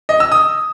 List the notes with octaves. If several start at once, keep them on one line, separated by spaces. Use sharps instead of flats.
D#5
E6
D#6